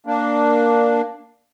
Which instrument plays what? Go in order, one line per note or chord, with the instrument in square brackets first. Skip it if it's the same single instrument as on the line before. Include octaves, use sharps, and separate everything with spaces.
[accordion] A#3 D4